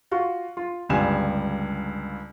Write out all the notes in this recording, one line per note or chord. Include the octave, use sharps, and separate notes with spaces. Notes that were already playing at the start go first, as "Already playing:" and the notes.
F4 F#4 F5
F4
G1 C#2 G3 G#5 E7